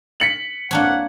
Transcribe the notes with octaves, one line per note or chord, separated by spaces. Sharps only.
B6 C#7 F#7
C2 G2 A#3 D4 C#5 F#5